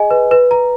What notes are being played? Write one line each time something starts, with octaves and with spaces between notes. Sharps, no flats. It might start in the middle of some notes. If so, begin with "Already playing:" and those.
Already playing: G#4 D#5 G#5
B4
B4
A#5